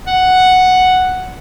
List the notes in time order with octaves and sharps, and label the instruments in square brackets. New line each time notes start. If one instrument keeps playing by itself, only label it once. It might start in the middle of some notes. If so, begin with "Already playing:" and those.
[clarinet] F#5